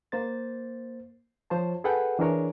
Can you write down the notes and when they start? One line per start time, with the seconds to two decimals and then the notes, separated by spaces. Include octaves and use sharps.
0.12 A#3 C5 A6
1.50 F3 C5 C#5 A5
1.84 G#4 A4 B4 F#5 G5
2.19 E3 D4 G#4 A#4 C#5